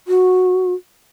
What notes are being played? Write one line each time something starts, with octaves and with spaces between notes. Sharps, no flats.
F#4